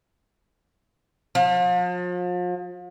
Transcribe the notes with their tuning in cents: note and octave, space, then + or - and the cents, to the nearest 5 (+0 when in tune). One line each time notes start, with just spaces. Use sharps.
F3 +40